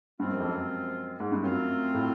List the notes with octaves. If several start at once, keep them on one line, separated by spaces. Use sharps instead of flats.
G2 C3 F3 G#3 C4 F4
F#2
F2
F#2
G#2
G2
F#2 F#3 A3 C4 F4
A2